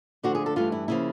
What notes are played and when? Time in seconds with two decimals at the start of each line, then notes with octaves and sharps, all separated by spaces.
0.23 D2 D3 F3 F#4
0.35 G#4
0.46 A4
0.56 G2 E3 A3 F4
0.72 E4
0.88 C#3 F3 A#3 E4